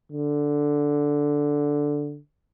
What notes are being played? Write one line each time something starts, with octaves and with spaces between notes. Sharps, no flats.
D3